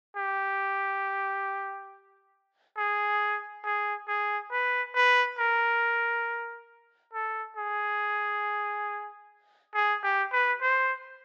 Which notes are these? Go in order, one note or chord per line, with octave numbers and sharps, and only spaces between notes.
G4
G#4
G#4
G#4
B4
B4
A#4
A4
G#4
G#4
G4
B4
C5